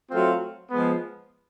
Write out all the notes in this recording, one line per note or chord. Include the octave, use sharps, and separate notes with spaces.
F#3 A3 C4 F4
F3 G#3 B3